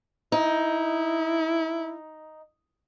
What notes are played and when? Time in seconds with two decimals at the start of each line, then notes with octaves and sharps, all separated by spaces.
0.32 D#4 E4